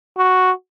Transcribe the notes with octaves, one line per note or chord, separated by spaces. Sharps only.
F#4